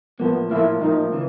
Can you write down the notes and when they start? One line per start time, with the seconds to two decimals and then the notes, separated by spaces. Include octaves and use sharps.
0.20 A2 F3 A#3 B3
0.51 A2 F3 A#3 E4
0.81 A2 F3 A#3 D#4
1.12 C#3 E3